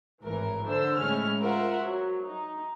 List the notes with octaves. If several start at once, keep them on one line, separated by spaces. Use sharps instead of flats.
G#1 A2 E3 A#4
D3 A4 C5 E6
A2 G#3 C#4 F6
F4 A#4 C5 E5 F#5
F#3
D#4